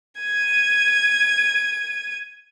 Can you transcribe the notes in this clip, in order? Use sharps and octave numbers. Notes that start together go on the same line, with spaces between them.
G#6 D#7